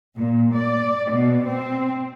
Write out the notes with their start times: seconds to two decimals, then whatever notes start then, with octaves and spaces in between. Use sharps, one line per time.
0.17 A#2
0.55 D5
1.10 B2
1.47 C4